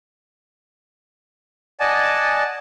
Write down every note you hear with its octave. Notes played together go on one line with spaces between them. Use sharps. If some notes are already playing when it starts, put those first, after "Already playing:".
D5 D#5 F#5 G#5 A5